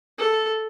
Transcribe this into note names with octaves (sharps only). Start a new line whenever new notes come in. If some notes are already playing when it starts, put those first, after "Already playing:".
A4